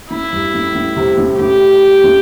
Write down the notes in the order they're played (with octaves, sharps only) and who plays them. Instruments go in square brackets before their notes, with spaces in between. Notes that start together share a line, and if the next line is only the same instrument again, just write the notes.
[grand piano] A2 [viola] E4
[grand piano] G2
A2
A2
C3
A2
[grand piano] A2 [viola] G4
[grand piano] A2